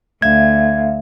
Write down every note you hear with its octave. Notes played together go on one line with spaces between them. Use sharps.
D2 E5 F5 G#6